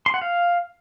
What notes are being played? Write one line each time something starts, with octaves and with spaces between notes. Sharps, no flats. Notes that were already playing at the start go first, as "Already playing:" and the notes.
C6
F#5
F5